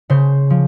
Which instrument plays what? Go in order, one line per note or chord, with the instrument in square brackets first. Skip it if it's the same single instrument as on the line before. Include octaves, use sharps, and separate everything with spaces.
[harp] C#3 C5
F3